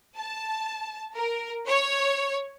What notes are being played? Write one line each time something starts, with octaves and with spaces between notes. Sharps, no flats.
A5
A#4
C#5